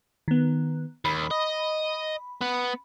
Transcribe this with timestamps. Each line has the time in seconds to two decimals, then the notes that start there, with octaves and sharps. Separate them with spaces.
0.28 D#3 B3
1.05 D#2 B5
1.31 D#5
2.41 B3